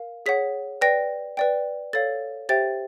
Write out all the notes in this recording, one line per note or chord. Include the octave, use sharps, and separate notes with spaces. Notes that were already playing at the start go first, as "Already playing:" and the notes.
Already playing: A#4 F5
G#4 C#5 F#5 B6
B4 D5 G5 A#6
B4 D5 G5
A4 C#5 F5 A6
G4 C5 E5 G5 A6